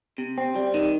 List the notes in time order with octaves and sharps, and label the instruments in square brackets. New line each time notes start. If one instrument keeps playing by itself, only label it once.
[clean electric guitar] C3
C4
G3
D#3